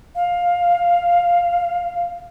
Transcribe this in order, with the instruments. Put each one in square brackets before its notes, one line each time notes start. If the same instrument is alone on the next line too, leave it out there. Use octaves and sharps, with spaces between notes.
[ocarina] F5